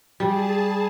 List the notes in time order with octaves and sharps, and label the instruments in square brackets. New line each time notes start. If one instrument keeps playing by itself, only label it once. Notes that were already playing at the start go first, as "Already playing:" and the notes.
[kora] G3 [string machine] G#4 A5